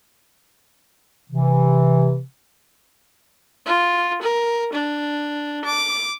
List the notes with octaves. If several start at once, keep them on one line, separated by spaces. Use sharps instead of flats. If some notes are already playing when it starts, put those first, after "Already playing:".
C3 E3
F4
A#4
D4
D6